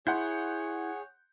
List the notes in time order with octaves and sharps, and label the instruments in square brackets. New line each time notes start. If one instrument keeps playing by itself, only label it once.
[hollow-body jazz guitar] E4 [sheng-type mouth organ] G#4 C#5 [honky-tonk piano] F#5 C6 G6